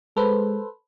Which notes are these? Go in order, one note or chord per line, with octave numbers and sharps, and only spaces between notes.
G#3 A4 B4 C5